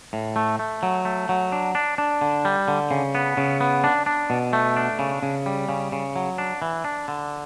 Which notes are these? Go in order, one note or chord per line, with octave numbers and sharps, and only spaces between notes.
A2
A3
A3
F#3
A3
F#3
D4
D4
D4
D3
G3
D3
C#3
B3
C#3
B3
D4
D4
B2
A3
D4
C#3
C#3
G3
C#3
C#3
F#3
D4
E3
D4
D3